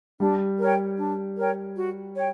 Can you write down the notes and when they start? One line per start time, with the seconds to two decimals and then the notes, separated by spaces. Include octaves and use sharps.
0.20 G3 D4
0.59 A#4 C#5 G5
0.99 D4
1.36 A#4 C#5 G5
1.76 F#4
2.15 C#5 G5